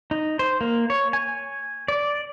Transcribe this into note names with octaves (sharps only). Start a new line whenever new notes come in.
D#4
C5
A#3
C#5
G#5
D5